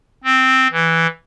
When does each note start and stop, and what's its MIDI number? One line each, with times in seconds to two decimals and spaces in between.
0.24 0.68 60
0.72 1.07 52